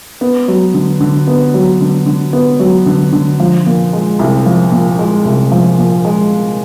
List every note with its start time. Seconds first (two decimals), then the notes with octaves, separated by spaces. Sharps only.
0.21 B3
0.48 F#3
0.74 D3
1.01 D3
1.28 B3
1.54 F#3
1.81 D3
2.06 D3
2.33 B3
2.60 F#3
2.86 D3
3.13 D3
3.40 F3
3.66 A#2
3.93 G#3
4.19 C2
4.46 F3
4.72 A#2
4.99 G#3
5.25 C2
5.52 F3
5.78 A#2
6.05 G#3